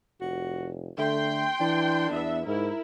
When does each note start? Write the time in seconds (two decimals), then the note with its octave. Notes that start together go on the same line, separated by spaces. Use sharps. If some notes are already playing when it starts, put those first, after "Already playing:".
0.21 F1 F#4
0.98 D3 A3 G5 C6
1.60 E3 D4
2.12 E2 B3 E5
2.47 G#2 E4 A#4